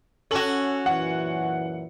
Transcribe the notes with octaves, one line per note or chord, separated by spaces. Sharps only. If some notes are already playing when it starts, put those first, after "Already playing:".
C#4 F#4 A4 F#7
F#2 A#2 E3 F#5